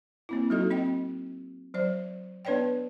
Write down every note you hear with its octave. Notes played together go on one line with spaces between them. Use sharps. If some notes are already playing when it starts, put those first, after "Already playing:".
A#3 C4 E4
F#3 D#4 F#4 A4 D#5
C4 D#5 G5
F#3 C5 D5
B3 D4 B4 C#5 D5 G5